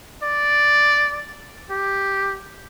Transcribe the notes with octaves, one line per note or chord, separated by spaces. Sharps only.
D5
G4